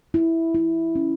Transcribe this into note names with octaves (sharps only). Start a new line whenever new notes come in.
E4
E4
C#4